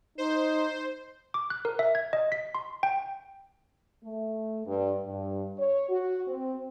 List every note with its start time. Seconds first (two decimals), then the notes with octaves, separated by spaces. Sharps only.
0.18 D#4 C5
1.34 D6
1.50 F#6
1.65 A#4
1.79 E5
1.95 G#6
2.13 D#5
2.32 B6
2.55 C6
2.83 G5
4.04 A3
4.65 G2
5.05 G2
5.58 C#5
5.89 F#4
6.28 C4